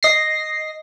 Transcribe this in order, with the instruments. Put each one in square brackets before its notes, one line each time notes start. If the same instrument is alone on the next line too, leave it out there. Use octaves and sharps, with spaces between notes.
[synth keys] D#5 A#6 C7